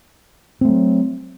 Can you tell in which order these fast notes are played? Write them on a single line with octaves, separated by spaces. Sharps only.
C4 A3 F#3